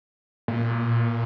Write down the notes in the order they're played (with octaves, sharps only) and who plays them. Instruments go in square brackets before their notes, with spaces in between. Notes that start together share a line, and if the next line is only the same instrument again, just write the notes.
[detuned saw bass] A#2